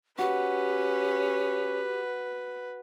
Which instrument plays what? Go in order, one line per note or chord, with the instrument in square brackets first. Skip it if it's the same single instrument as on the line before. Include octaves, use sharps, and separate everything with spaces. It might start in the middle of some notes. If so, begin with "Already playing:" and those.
[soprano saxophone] C#4 [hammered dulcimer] F#4 [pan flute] G4 [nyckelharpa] B4